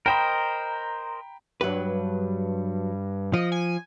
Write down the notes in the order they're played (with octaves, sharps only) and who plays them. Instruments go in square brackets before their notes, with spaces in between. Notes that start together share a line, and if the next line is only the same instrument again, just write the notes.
[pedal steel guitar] A#4 C5 D#5 [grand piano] G5 A#5 B5
[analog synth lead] G2 [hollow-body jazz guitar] F#3 B4
[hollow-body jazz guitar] F3 [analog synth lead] D#5
[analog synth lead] G#5